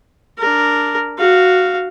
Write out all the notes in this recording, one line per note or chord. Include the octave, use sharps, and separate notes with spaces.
D4 A#4
F#4 F5